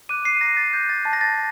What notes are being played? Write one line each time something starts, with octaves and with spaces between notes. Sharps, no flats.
D6 F#6 D#7
C7
A#5 A#6
A6
D6 F#6 G6
A6
A5 A6
A#6
A6